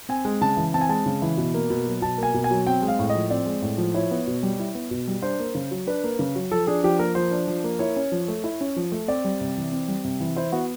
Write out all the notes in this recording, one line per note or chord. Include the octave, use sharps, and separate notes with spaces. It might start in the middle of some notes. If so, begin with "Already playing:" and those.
C4 G#5
G#3
C#3 A5
E3
C4 A5
G#5
G#3 A5
C#3
E3
B2
A#3
B2
F#3
B2 A5
A#3 G#5
B2
G#5
F#3
C4 G5
G#3
F5
A2
D#5
F3
C4 D5
G#3
A2
F3
E4 C#5
B3
B2
G3
E4
B3
B2
G3
D4 C5
A#3
C#3
F#3
D4 B4
A#3
C#3
F#3
F3 A4
D4 G#4
F3 G4
A#3 A#4
F3 C5
D4
F3
A#3
E4 C#5
C#4
F3
A3
E4
C#4
F3
A3
C4 D5
G3
C3
E3
C4
G3
C3
E3
E4 C5
B3 F#4